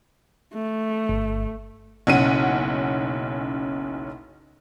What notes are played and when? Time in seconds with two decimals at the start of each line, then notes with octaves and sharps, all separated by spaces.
0.53 A3
1.09 G1
2.07 F#1 B1 C#4 F#5 D#7